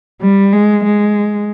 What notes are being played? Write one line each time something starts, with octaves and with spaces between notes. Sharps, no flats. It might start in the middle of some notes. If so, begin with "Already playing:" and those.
G3
G#3
G#3